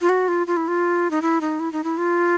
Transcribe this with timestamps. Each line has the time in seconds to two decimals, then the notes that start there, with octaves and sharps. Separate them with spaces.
0.01 F4
0.09 F#4
0.28 F4
0.47 F4
0.57 E4
0.68 F4
1.11 D#4
1.22 E4
1.41 D#4
1.60 E4
1.72 D#4
1.84 E4
1.97 F4